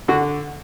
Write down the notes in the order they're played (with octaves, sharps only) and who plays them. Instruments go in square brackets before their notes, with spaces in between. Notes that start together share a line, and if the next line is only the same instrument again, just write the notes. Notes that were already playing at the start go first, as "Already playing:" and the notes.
[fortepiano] D3 F#4